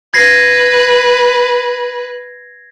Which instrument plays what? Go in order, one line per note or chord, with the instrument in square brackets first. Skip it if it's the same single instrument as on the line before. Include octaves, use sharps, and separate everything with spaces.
[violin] B4 [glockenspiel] G#6 A#6 C7